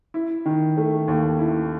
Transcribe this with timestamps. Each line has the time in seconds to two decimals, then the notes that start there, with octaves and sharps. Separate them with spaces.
0.14 E4
0.46 D#3
0.77 A3
1.08 D#2
1.39 E4